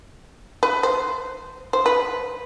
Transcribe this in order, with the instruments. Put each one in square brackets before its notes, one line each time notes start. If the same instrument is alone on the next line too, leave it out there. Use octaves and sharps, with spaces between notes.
[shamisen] B4
C5
C5
B4